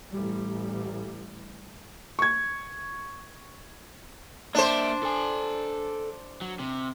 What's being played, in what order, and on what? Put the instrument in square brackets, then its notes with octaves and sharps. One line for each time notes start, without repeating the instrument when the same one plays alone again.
[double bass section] A1 A2 G3
[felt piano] C#6 G#6
[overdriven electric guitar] A#3 E5 [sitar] D4 C5
[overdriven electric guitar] A4 G#5
F#3
C3